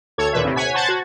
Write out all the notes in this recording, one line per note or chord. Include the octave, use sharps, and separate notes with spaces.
D2 A4 C#5 G#6
D#2 A#2 B4 E5
A2 C3
C#5 F#5 G#5 G#6 B6
C5 F#5 A5 F#6 G#6 A6
F#4